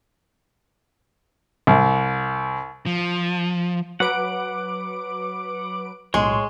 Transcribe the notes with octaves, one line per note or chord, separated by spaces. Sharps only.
C2
F3
F#3 B4 F#5 D6 D7
B1 A2 G#3 C#5 C6 C#6